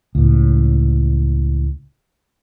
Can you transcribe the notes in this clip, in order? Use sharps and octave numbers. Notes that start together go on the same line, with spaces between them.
C#2 A2